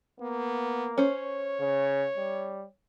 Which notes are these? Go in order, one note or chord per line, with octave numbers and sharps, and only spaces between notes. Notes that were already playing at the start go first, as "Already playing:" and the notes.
A#3 B3
C#4 C5 C#5
C#3
G3